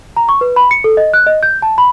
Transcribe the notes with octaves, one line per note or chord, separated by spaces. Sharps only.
A#5
C#6
B4
B5
C#7
A4
D#5
F#6
D#5
G6
A5
B5